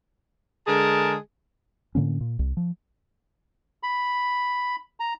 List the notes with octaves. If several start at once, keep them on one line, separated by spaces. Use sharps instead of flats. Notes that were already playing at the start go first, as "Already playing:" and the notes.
D3 G#3 G#4 A#4 A5
A2 D3 A#3 C#4
A#2
C2
F3
B5
A#5